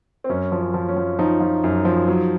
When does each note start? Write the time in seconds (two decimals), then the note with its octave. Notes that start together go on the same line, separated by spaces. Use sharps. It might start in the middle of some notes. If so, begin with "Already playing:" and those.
0.24 C4
0.29 F#2 C#4
0.52 F3
0.59 C#4
0.74 F3
0.88 C#4
0.97 F3
1.19 F3 D#4
1.40 F3
1.64 F#2
1.85 F3
2.08 F#3